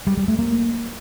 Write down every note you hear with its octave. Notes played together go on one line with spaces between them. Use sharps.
G3
G3
A3
A#3